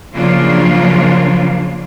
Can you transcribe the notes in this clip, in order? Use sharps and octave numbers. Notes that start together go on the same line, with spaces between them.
C#3 F3 F#3 A#3 D4 F4